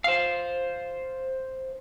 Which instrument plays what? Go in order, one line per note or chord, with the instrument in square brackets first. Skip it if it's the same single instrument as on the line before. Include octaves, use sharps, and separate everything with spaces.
[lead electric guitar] C5 F5